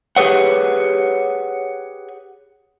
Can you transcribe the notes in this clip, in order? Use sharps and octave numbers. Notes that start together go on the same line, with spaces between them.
G4 G#4 B4 C#5 F#5